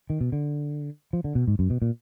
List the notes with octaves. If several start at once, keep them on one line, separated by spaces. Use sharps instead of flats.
D#3
B2
D3
F3
D3
B2
G#2
F#2
B2
A#2